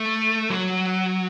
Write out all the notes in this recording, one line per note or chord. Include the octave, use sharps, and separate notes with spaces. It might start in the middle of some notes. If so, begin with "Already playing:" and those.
Already playing: A3
F#3